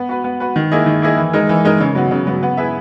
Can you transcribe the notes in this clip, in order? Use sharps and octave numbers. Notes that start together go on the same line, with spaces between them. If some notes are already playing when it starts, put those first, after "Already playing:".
Already playing: B3
F#4 B4
B3
F#4 B4
D#3
A#3 E4 G#4 D#5
D#3
A#3 E4 G#4 D#5
E3
G#3 D#4 A#4
E3
G#3 D#4 A#4
C#3
F#3 B3
C#3
F#3 B3
B3
E4 G#4 B4 E5